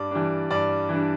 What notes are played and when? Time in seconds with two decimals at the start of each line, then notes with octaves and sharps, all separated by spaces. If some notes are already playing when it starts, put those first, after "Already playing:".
Already playing: G2 D5
0.11 E3 G3 D4
0.50 G2 D5
0.89 E3 G3 D4